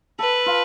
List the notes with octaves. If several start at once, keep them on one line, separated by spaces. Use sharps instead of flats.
A4 B4
F4